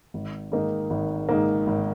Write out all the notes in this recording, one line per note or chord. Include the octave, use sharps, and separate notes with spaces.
G#1
G#2 D#3 A#3 D#4
G#1
G#2 D#3 A#3 D#4
G#1